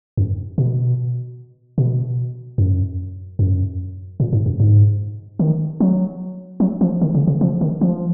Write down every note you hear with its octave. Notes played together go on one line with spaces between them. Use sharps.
F#2
B2
B2
F#2
F#2
A#2
G#2
F#2
G#2
D#3
F#3
F#3
F3
D#3
C#3
C#3
F3
D#3
F3